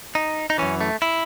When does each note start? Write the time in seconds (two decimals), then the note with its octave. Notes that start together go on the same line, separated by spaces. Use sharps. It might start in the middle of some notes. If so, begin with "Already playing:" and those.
0.15 D#4
0.50 D#4
0.58 F#2 E3 C#4
0.81 A3
1.02 E4